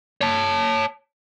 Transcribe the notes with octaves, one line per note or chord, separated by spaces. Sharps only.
C#5 A5